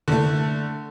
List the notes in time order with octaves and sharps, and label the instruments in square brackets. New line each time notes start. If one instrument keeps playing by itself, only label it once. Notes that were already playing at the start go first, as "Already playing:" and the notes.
[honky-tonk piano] D3 A3